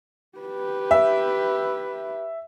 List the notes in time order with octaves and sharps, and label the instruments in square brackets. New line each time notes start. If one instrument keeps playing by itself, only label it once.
[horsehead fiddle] G4 B4
[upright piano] E5